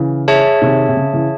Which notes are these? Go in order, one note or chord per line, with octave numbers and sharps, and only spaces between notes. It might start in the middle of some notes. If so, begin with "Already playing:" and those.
Already playing: C#3 E3
G#4 C#5 E5 A5
C3 D#3
C3
C#3
C#3 E3